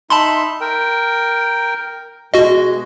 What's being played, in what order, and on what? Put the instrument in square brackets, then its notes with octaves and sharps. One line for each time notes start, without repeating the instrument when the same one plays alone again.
[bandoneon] D#4 E5 [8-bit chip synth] A5 B5 C6
[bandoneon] A#4 G5
[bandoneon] B2 G#3 [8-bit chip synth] F#4 D#5